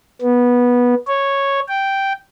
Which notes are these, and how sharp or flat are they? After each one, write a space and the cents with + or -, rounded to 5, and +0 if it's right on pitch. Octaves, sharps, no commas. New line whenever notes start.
B3 -15
C#5 -5
G5 -5